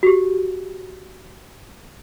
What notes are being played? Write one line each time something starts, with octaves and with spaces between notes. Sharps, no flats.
F#4 G4